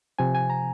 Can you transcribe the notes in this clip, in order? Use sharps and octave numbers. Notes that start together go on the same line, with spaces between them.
C3 F3 C4 G#5
G#5
A#5